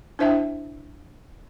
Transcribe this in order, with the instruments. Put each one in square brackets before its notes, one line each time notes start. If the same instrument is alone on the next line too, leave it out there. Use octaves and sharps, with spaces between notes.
[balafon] D4 E4 C5 E5 G5 A5